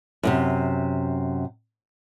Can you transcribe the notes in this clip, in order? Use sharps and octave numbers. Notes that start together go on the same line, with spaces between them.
F#2 A2 C3